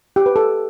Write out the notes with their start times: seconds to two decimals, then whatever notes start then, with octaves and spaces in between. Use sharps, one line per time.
0.16 G4
0.26 B4
0.36 A4